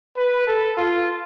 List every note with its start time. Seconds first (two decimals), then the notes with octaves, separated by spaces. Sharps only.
0.17 B4
0.47 A4
0.77 F4